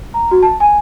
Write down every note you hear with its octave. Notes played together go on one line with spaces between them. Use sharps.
A#5
F#4
A5
G#5